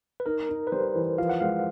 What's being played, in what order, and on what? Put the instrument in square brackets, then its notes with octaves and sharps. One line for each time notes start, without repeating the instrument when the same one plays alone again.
[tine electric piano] B4
[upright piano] D#4 [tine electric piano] A#4
[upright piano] D#4
[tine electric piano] B4
[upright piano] G3 [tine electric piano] C5
[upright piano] E3
[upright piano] F3 [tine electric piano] F5
[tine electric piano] F#5
[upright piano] G#3 [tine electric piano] F5